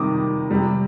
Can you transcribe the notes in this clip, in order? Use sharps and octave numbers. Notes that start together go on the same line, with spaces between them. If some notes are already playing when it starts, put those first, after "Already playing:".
Already playing: C3 D#3 G3 D6 D#6
C3 G3